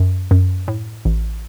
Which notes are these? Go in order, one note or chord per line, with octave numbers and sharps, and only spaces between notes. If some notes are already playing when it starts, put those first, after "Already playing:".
Already playing: F#2
F#2
A2
A1